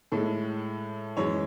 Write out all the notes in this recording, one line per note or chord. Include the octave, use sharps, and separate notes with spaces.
A2 G#3 A4
F#2 E3 G#3 C#5